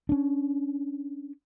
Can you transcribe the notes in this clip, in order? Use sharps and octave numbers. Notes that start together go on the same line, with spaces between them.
C#4 D4